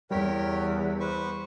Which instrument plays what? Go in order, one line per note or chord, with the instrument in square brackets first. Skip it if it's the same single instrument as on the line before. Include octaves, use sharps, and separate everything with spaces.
[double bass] E2 [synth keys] G3 B6 [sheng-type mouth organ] A#4 C#5 G5
[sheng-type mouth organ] B4 C5 C#6